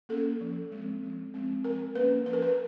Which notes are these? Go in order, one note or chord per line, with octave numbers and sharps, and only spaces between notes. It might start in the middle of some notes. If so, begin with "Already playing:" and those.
A#3 C#4 A4
F3
G#3 C4
F3
G#3 C4
F3 A#4
A#3 C#4 B4
F3 B4
A#4
B4